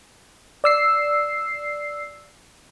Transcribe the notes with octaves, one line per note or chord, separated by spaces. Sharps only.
D5 E6 C7